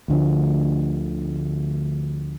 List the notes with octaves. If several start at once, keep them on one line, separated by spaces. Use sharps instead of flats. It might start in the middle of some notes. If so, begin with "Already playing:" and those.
D2 D3 F3